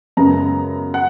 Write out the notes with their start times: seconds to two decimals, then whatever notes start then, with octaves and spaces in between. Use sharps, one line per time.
0.17 F#2 C#3 G#3 B3 A#5
0.94 F#5